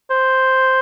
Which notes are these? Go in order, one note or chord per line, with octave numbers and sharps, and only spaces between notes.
C5